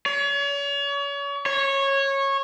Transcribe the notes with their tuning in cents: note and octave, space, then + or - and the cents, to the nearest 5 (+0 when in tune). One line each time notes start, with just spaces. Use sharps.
C#5 +35
C#5 -15